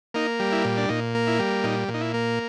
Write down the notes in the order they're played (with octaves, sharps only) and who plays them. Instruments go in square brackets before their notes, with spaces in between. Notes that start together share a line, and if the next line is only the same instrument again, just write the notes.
[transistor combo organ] A#3 D#4
G3
E4
A#2
D4
A#2 D#4
A#3
E4
G3
A#2 D#4
A#2
D#4
E4
A#3